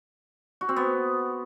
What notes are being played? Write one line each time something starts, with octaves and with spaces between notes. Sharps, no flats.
F#4
C4
B3